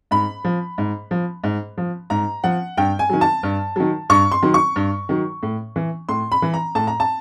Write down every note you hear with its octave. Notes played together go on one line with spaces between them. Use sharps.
G#2 B5
F3
G#2
F3
G#2
F3
G#2 A#5
F3 F#5
G2 G5
G#5
D#3 F#3
A5
G2
D#3 F#3
G2 C#6
C6
D#3 F#3
C#6
G2
D#3 F#3
A2
E3
A2 C6
B5
E3
A#5
A2 A5
A#5
A5